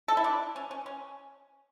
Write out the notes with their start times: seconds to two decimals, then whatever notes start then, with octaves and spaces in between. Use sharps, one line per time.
0.08 A4
0.17 E4
0.24 D4
0.56 C#4
0.71 C#4
0.86 C#4